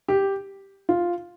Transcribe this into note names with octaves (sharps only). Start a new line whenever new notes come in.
G4
F4